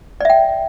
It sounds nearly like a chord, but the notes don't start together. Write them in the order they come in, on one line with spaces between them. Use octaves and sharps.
D5 E5 G5